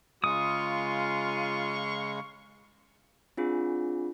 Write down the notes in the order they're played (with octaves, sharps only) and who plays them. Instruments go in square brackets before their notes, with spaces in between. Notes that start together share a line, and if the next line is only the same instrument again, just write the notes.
[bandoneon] C#3 G#3 [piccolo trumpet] F4 [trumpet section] F5 C6 C#6 [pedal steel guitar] D#6
[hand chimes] C4 D4 F4 G#4